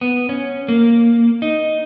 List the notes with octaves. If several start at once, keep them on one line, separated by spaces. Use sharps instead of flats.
B3
C#4
A#3
D#4